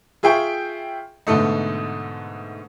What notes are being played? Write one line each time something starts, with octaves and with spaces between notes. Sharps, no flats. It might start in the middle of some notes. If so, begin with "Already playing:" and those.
F4 G#4 E5 G5 C#6
G#2 B2 D3 A3 D#4